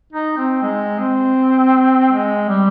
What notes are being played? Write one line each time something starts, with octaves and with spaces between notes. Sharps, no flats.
D#4
C4
G#3
C4
G#3
G3